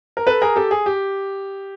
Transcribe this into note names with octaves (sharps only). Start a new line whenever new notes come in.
A#4
A4 B4
G#4 A#4
G4 A4
G#4
G4